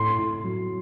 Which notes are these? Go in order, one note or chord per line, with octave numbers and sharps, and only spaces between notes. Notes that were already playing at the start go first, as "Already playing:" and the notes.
Already playing: A2 C6
A2
F#3